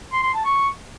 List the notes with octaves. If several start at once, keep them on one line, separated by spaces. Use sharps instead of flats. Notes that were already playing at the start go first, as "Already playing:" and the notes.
C6
C6
A5
C#6